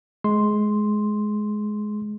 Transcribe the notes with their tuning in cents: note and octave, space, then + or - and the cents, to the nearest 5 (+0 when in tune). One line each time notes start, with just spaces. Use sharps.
G#3 +15 C6 +0